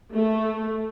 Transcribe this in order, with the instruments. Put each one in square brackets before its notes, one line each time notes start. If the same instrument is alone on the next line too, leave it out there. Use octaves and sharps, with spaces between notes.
[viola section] A3